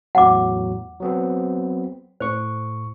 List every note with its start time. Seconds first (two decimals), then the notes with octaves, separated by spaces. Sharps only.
0.15 E2 A2 F#3 F#5 D6
1.00 F#3 B3 C4
2.20 A2 C5 C#6